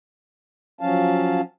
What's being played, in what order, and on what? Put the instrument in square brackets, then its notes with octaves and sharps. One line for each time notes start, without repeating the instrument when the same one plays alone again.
[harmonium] F3 F#3 C#4 F5 A5